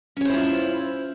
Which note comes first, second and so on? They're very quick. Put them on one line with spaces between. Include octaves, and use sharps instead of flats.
C#4 C#5 C5 E4 F4